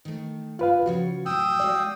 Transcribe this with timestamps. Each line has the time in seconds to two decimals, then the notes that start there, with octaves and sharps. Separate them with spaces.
0.05 D#3 A3
0.59 G2 F4 B4 F5
0.86 C#3 F3 F#4 C#5
1.26 A2 F#3 G5 D#6 E6
1.60 G#3 F#4 D5 F5